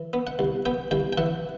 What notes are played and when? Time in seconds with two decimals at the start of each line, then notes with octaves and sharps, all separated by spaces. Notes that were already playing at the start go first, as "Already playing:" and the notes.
Already playing: E3
0.13 B3
0.27 F#5
0.39 C2
0.65 B3 G5
0.91 C2 G5
1.13 G5
1.18 E3 F#5